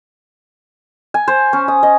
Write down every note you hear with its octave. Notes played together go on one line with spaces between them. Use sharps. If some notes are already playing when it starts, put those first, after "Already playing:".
G#5
C5
C#4
D#6
D#5